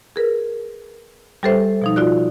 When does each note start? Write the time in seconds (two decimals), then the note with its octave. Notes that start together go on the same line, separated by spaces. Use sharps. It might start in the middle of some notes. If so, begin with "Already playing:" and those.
0.16 G#4 A#4 B4
1.43 G3 G4 A4 B4 C5 E5
1.82 B2 F3 D#4
1.96 F4 F#4 D5 F#6